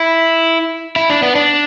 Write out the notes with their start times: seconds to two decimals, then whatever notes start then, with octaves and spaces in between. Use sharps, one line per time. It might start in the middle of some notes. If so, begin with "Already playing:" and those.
Already playing: E4
0.96 E4
1.10 D4
1.22 B3
1.35 D4